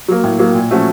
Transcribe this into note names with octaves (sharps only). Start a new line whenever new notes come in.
F#3 A#3
A2
F#3 A#3
A#2
F3 A3 C#4 F#4